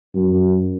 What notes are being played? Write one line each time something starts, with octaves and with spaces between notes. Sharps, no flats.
F#2